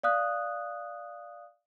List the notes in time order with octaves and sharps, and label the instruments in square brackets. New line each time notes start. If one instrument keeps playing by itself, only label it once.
[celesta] D5 F5 D#6 F#6